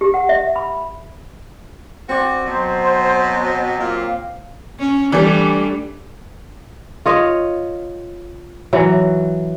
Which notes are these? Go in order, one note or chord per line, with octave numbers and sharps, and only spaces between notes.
G4
F#5
E5
B5
C4 F#4 D5
B2 F#3 C5
A#2 F5
C#4
E3 G3 A3 D4 G4 D5
F4 C#5 D#5
E3 F#3